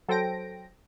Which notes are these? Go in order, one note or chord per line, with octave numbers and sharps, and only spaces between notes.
F#3 A4 C5 G5 A#6 D7